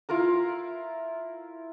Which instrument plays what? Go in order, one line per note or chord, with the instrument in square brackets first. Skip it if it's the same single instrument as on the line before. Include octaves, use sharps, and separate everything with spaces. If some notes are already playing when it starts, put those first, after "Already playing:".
[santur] E4 F4 A#4 A#5